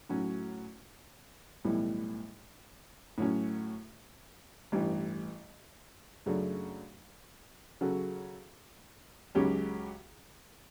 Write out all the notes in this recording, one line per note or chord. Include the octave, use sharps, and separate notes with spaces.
A2 F#3 C#4 F#4
B1 A2 E3 G3
A2 F#3 C#4
A1 G2 E3
F#2 C#3 F#3 A3 D4
C#3 F#3 C#4 F#4 A4
C#2 C#3 F#3 C#4 G4